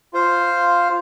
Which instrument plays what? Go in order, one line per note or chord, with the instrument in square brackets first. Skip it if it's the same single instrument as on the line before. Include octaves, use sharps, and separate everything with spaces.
[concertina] F4 C5 F5